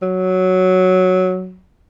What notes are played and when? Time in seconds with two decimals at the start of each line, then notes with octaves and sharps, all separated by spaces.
0.02 F#3